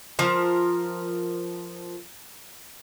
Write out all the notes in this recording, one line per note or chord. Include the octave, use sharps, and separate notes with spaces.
F3 A#4